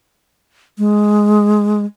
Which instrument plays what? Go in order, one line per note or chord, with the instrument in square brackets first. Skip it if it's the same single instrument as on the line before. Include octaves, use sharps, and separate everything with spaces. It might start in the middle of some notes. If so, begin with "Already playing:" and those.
[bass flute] G#3